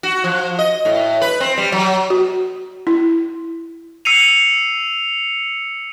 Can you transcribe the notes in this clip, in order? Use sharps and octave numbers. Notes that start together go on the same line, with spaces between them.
F#4
F3
D#5
A2
B4
C4
G3
F#3
F#4
E4
E6 C7 C#7 D#7 F7